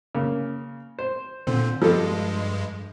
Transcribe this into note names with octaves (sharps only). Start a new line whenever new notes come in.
C#3 A#3
C5
A#2 D3 C4
G2 F3 G3 G#3 A4